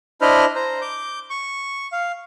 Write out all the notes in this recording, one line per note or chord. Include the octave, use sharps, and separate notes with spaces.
D4 E4 C5 D#5 B5 F6
C5 A#5
D6 G6
C#6
F5